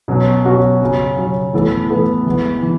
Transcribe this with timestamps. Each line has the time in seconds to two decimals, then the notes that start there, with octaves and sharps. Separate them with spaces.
0.08 B2 F#3 C#4 F#4
0.45 B2 F#3 C#4 F#4
0.80 C#3 F#3 C#4
1.18 C#3 F#3 C#4
1.53 A2 E3 B3 E4 A4
1.90 A2 E3 B3 E4 A4
2.26 E3 G#3 B3
2.62 E3